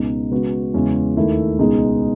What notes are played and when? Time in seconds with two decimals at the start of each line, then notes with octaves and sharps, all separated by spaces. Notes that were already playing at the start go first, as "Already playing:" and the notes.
Already playing: C#2 B2 G#3 D#4
0.31 C#3 G#3 B3 F#4 B4
0.74 E2 C#3 G#3 C#4 E4
1.16 D#2 D#3 A3 E4
1.59 C#2 B2 G#3 D#4 G#4